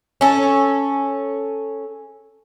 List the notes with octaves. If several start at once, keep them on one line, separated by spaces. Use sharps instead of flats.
C#4 A4